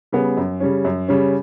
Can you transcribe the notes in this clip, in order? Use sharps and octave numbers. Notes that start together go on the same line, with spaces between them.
C#3 G3 B3
F#2
C#3 G3 C#4
F#2
C#3 G3 C#4